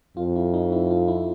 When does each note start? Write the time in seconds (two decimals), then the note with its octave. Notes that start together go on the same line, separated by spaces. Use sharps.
0.17 F2 F4
0.36 E4
0.54 D#4
0.72 E4
0.91 F4
1.08 E4